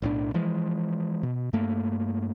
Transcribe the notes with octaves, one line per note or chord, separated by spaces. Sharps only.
B1 A2 E3 D4
E3 F3 G#3
B2
G2 A3 A#3